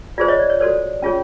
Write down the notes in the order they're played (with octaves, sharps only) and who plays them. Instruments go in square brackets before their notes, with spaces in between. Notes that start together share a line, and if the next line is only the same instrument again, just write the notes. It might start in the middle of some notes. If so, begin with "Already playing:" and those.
[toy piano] F4 G#4 C5 D5
C#5 D#5
D5
C#5
F#4 A4 C5 D5
C#4 F4 G#4 C#5